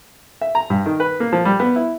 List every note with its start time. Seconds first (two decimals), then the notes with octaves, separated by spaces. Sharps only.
0.41 E5
0.55 A#5
0.70 G2
0.86 D#3
1.00 B4
1.20 A#3
1.33 F3
1.45 G3
1.60 B3
1.76 E4